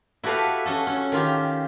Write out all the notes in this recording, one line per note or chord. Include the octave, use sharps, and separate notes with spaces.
E4 F#4 G4 A4 B4 F5
C#4 F#4 A4
C#4
D#3 F4 G4